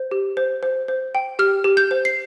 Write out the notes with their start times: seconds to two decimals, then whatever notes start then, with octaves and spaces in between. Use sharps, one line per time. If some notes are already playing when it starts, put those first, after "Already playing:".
Already playing: C5
0.11 G4
0.37 C5
0.63 C5
0.88 C5
1.15 G5
1.39 G4 F6
1.64 G4
1.77 G6
1.91 C5
2.05 C7